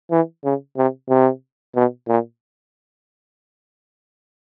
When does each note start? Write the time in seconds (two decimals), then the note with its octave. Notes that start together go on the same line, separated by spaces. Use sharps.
0.11 E3
0.44 C#3
0.77 C3
1.09 C3
1.75 B2
2.08 A#2